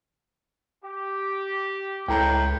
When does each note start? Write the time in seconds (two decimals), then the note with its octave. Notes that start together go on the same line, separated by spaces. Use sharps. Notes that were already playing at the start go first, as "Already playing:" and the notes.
0.83 G4
2.08 C#2 A2 G5 A#5 G6